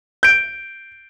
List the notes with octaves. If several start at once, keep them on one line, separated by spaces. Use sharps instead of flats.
G6 D7